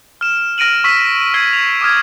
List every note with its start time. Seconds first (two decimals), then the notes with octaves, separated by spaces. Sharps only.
0.21 F6 E7
0.58 F6 A#6 D7 D#7 F#7
0.84 C#6 E6 B6 D#7
1.34 E6 F6 G#6 C7 G7
1.53 F7
1.81 D6 D#6 F6 G#6